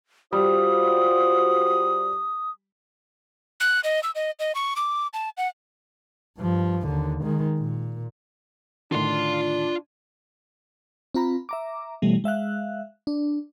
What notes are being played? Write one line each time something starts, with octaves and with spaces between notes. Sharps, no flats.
G3 F4 F#4 C5 D#6
F#6
D#5
E6
D#5
D#5
C#6
D6
A5
F#5
G2 F3
D#2 D3
D#3 G#3
A#2
A2 D3 D#3 D4 F4 C6
C4 F4 A#5 B5
E5 A#5 D6
B2 E3 G3 A3
G#3 E5 F5 F#6
D4